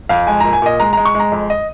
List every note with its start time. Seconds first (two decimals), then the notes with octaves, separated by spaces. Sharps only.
0.09 F2 F5
0.27 G#3 G#5
0.40 A#2 A#5
0.53 G#5
0.62 A#2 D#5
0.80 G#3 A#5
0.93 G#3 A#5
1.05 C#6
1.15 G#3
1.20 A#5
1.32 F2
1.50 D#5